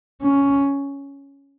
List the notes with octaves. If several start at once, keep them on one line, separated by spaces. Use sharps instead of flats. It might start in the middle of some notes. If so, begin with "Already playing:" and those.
C#4